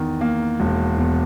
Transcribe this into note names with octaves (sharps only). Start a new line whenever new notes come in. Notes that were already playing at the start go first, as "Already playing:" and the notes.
Already playing: E2 D#3
A#3
E1
E2